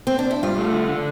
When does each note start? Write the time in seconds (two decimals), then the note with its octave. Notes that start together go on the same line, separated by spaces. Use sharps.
0.07 C4
0.19 D4
0.31 E4
0.43 G2 F4
0.58 A3
0.73 D3
0.88 D3